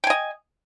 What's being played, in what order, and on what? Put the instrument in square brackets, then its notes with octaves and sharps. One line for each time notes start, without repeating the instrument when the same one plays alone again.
[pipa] G5
G#5
D#5